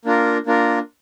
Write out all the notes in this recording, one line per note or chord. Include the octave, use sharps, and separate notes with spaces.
A#3 D4 F4 A#4
A#3 D4 F4 A#4